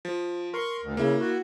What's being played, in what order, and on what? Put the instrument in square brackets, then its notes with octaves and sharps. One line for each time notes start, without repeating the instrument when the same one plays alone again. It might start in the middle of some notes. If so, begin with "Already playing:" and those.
[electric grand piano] F3
[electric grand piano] A#4 [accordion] C6 C#6
[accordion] D2
[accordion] C#3 [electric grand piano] A#3 E4
[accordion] F#4